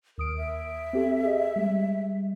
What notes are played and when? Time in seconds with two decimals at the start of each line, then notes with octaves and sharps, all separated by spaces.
0.18 D#2 A#4 D#6 D7
0.37 E5
0.93 C4 G4 A4
1.23 G#4 D#5
1.56 G3 G#3